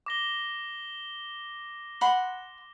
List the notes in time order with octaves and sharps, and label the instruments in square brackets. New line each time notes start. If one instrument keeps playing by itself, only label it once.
[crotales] D6 A#6 G7
[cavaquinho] F#5 B5 C6